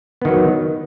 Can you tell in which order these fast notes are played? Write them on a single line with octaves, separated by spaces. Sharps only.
B3 D#3 F#3